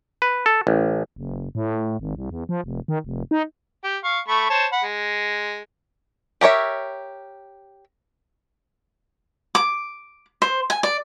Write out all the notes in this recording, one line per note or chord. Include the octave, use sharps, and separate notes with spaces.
B4
A4
A1
F#1
A2
G#1
C2
E2
F3
F1
D#3
F1
D#4
G4
F5 C#6
A3 B5 C#6
C5 C#5 A5
F#5 B5
G#3
G4 A#4 C#5 E5
D6
C5
G#5
D5